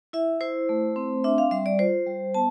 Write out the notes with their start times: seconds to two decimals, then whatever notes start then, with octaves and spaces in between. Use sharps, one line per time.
0.13 E4 E5
0.41 E4 C5
0.69 A3
0.96 C4
1.24 D4 E5
1.38 F5
1.51 G3 E5
1.66 D5
1.79 F4 C5
2.07 G3
2.34 B3 A5